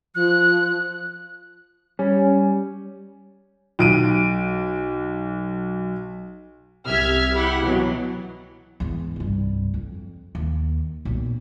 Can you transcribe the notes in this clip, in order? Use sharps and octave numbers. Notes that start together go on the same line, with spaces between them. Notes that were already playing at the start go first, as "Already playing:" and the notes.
F3 F#6
G3 C#4
B1 D7 D#7
C2 G4 E5 F6 G#6 B6
E4 G4 F#5
B2 E3 F#3
E2 G#2
C2 G2
F2
D#2
B1 A#2